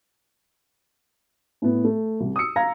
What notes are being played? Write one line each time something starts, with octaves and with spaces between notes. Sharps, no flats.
A2 B3
A3
C2
D#6 E6 C#7
F5 A#5 G#6 A#6